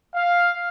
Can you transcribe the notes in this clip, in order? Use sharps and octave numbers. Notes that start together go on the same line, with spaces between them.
F5